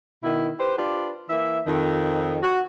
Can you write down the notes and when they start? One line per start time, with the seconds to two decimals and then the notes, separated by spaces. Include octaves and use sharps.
0.23 B2 D#3 E4
0.60 G4 B4 C5
0.78 D4 F4 G4 B4 D5
1.29 E3 A#3 E5
1.66 F2 D#3
2.43 F#4